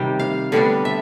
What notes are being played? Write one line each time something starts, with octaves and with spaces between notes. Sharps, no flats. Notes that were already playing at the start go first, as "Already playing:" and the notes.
Already playing: C3 D#3 G3 G5
F5
D3 G3 B3 D4
E5